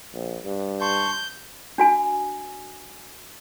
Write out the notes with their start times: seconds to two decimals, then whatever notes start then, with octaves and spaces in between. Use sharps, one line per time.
0.14 A#1
0.44 G2
0.81 A5 C6 C#6 G6
1.78 D4 F#4 G#5